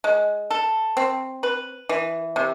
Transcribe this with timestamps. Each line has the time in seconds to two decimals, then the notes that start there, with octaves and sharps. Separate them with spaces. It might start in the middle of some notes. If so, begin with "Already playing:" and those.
0.04 G#3
0.51 A4
0.97 C4
1.43 B4
1.89 E3
2.36 C3